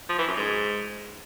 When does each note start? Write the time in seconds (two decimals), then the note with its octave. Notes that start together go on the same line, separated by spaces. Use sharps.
0.09 F3
0.18 E3
0.27 F#2
0.37 G#2